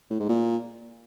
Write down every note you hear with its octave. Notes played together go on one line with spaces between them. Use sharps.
A2
G#2
A#2